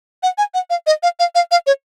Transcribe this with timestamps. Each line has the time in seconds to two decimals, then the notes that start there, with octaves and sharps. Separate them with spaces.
0.23 F#5
0.38 G#5
0.54 F#5
0.70 F5
0.87 D#5
1.03 F5
1.19 F5
1.35 F5
1.51 F5
1.67 C#5